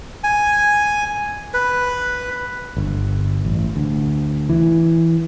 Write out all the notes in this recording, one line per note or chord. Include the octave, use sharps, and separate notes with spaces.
G#5
B4
G1
A1
D2
E3